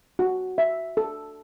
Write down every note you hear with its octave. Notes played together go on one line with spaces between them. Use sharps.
F#4
E5
A4